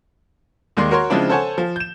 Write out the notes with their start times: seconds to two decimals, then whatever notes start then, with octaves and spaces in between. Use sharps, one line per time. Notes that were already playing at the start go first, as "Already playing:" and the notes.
0.77 D#2 D#3 G#3 D5 C6
0.91 F#4 A#4 C#5 C6
1.10 C#3 F3 G#3 C4 D4 E4
1.29 A4 C5 C#5 F#5 G#5 A5
1.58 F3
1.76 G6 E7